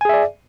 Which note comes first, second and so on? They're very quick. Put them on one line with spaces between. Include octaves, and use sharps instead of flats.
G#5 G#4 E5 D5